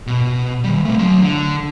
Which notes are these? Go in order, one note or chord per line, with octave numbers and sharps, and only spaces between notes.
B2
D#3 G3
A3 C4
F#3 C6
D3